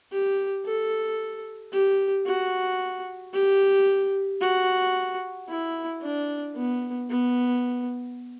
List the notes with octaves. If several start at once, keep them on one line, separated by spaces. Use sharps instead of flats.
G4
A4
G4
F#4
G4
F#4
E4
D4
B3
B3